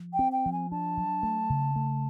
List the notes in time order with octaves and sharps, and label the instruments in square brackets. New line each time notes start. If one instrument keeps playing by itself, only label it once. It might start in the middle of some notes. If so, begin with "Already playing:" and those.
Already playing: [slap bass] F3
[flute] G5
[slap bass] C4
[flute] G5
[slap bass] F3
[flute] G#5
[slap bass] D4 [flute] A5
[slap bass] F#3
A3
C#3
A3